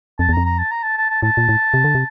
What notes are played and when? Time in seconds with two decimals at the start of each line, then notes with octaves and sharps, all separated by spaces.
0.19 F2 A5
0.29 E2
0.33 A#5
0.37 F2
0.45 A#5
0.58 A5
0.71 A#5
0.83 A5
0.97 A5
1.10 A5
1.23 A2 A5
1.37 A#2
1.49 A2
1.74 C3
1.84 D3
1.95 C3